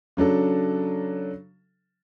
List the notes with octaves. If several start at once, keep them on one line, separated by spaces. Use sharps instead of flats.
C#3 F#3 D4 A4